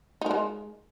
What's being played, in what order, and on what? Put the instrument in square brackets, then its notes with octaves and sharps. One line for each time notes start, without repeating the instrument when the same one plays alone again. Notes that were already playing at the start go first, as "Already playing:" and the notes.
[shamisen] D#4
A#4
G#3